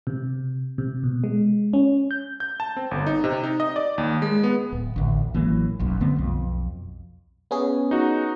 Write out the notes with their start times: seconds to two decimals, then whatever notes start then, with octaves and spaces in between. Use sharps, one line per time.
0.07 C3
0.78 C3
1.03 B2
1.24 G#3
1.73 C#4
2.11 G6
2.40 G6
2.60 A5
2.77 C4
2.91 G1
3.07 D#4
3.24 C3
3.43 D#4
3.60 D#5
3.76 D5
3.98 D#2
4.22 G#3
4.44 B3
4.72 D1
4.96 A1 D2
5.34 A1 E3 F#3 A#3
5.79 E1 B1 F#2
6.00 D3 A3 B3 C4
6.16 B1 F2
7.51 B3 C#4 G#4
7.91 D#4 F#4